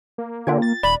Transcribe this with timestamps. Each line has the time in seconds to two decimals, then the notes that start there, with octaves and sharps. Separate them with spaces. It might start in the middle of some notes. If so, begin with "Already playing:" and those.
0.18 A#3
0.47 D3 F4 G5 G#6
0.62 A6
0.83 D#1 D5 B5